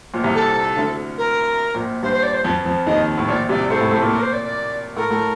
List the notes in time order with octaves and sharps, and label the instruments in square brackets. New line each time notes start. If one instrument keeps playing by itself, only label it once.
[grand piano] A#1 A#2
C2 C3
[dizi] A4
[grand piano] D2 D3
[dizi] A#4
[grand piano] A#1 A#2
[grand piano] G2 [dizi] C5
[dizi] C5
D5
C5
[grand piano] F2 F3
F2 F3
[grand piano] D#2 D#3 [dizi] D#5
[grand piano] A2
[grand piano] A#1 A#2 [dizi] D5
[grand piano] C2 C3 [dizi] D5
[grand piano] A2 A3 [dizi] C5
[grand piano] A2 A3
A2 A3
A#2 A#3
[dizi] A#4
C5
D5
D5
[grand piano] A2 A3 [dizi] A#4
[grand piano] A2 A3